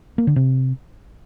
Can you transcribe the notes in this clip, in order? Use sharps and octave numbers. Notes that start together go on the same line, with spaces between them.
A#3
D3
C3